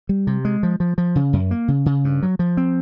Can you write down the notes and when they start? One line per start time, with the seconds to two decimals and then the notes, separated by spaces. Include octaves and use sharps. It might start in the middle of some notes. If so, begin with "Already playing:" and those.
0.09 G3
0.27 C3
0.45 G#3
0.63 F3
0.80 F3
0.98 F3
1.15 C#3
1.33 F#2
1.51 A#3
1.68 C#3
1.86 C#3
2.05 G2
2.23 F#3
2.39 F3
2.57 C4